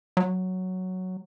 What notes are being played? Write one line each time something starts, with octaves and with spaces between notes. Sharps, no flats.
F#3